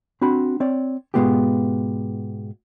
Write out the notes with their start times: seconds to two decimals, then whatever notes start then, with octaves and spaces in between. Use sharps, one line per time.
0.21 C4 D4 F#4 B5
0.60 C4 C#5 D5
1.14 G#2 B2 G#3 B3 F4 G4